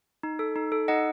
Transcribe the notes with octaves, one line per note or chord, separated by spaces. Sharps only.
D#4
A4
D#4
A4
D#4 D#5 F#5